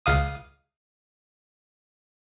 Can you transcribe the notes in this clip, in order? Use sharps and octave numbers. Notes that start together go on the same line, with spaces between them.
C#2 F5 D#6